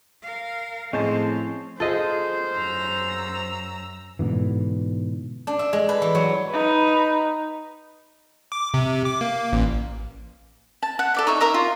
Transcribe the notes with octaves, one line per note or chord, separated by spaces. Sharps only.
A#4 F5
A2 F3 G#3 C4 C#4 C5 A5
F4 G#4 A4 C5 D#5
F#2 A#5 E6
G#2 B2 D3 E3
D4
E5
G#3
B4
E3
F#3
D#4 B4
D6
C3
D6
A#3
A1
A5
F#5
A4 D5 E5
D#4 C#5 E5
A#4 E5 A#5
F4